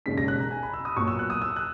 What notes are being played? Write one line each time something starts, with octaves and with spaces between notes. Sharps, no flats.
E1 D#2 C#3 G#3 C#4 B6
A#6
F#6
A#5
G#5
B5
E6
D#6
A#2 F#3 B3 C#6
E6
F#6
D#6
E6
F#6